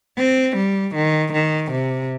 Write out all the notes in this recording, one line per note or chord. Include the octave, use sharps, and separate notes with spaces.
C4
G3
D#3
D#3
C3